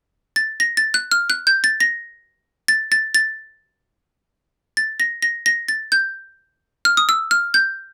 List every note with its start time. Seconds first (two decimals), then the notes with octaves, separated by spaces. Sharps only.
0.36 A6
0.60 A#6
0.77 A6
0.94 F#6
1.11 F6
1.30 F#6
1.47 G6
1.64 A6
1.80 A#6
2.68 A6
2.92 A6
3.15 A6
4.77 A6
5.00 A#6
5.22 A#6
5.46 A#6
5.68 A6
5.92 G6
6.85 F6
6.97 D#6
7.09 E6
7.31 F6
7.54 G6